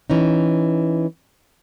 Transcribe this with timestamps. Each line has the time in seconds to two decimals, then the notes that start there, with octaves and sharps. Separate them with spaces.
0.10 E3 C#4 D#4